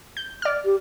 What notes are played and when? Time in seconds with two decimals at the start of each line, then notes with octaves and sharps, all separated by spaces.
0.17 G6
0.42 D5 F6
0.65 G4